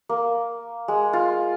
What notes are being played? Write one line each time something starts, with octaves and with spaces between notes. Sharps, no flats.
A#3
G#3
F4